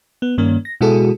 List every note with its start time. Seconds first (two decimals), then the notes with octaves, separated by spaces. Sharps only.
0.22 B3
0.38 G2 D#3 A#3 C#4
0.65 A#6
0.81 B2 G#3 E4 F#4 G#4 A4